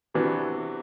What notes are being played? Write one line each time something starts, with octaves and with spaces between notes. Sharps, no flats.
C3 E3 B3 D4 F#4